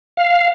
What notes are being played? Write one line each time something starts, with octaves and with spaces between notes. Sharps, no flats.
F5